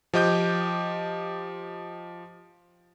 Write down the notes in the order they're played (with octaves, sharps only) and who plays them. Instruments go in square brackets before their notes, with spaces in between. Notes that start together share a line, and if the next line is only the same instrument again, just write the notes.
[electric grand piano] F3 G4 D#5 D6 G6